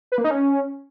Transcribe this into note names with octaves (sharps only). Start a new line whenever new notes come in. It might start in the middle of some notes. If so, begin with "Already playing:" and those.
B4
A#3
D#4
C#4